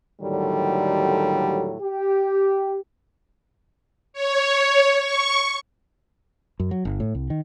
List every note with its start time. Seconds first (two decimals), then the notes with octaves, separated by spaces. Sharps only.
0.21 D#2 A2 D3 D#3 F#3 G3
1.81 G4
4.13 C#5
4.99 C#6
6.60 F#2
6.71 F#3
6.85 G1
7.00 A2
7.15 C2
7.30 D#3